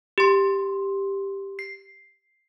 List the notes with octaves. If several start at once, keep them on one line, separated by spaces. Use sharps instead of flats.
G4 C6
C7